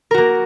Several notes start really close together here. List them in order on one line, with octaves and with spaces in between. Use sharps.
A#4 F#4 A#3